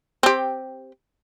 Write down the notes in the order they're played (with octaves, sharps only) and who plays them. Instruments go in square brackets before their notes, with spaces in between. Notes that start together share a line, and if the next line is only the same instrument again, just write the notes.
[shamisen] C4 G4